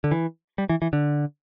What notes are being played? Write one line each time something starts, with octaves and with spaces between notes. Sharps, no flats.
D3
E3
G3
E3
E3
D3